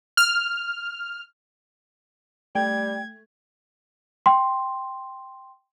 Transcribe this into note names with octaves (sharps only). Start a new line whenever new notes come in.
F6
G3 A3 G5 G#6
G5 C6